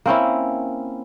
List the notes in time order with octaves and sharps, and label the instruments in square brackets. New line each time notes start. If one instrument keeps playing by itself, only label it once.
[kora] A#3 C4 C#4 E4